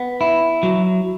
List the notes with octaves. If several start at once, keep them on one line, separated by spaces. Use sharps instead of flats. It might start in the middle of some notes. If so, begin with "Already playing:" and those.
Already playing: B3
E4
F#3